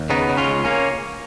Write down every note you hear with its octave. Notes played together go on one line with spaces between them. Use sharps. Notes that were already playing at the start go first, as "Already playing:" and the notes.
Already playing: D#2
C#3 B3 D#4
C#3
C#4 F4
C#2
A#3 C#4